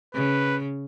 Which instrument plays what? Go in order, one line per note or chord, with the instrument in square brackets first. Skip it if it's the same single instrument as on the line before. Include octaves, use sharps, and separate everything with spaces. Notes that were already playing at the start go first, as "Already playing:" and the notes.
[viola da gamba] C#3 [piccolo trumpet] B4